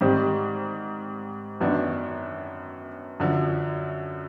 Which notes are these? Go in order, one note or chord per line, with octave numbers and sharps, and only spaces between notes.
G#2 D#3 G3 C4
F#2 D#3 F#3 B3 D4
F#2 D3 F3